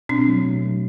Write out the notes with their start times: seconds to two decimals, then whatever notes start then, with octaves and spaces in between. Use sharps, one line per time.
0.09 B2 C4 D4
0.28 F#3 A3
0.45 B2
0.63 F#3 A3